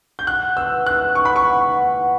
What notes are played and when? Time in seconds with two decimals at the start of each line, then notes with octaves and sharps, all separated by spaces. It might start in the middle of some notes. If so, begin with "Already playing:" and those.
0.19 G6
0.27 F#5 F#6
0.57 B4 E6
0.86 B4 F#6
1.15 F#5 C#6
1.25 B5
1.36 C#6
1.45 F#5
1.74 F#5